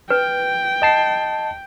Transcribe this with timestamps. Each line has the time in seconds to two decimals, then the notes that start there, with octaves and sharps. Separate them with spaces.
0.10 B4 G5
0.82 D#5 A5 C7